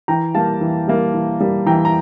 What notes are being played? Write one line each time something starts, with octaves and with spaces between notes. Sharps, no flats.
E3 G5 A#5
G3 A#3 F5 A5
E3
G3 A#3
E3
G3 A#3
E3 G5 A#5
A#5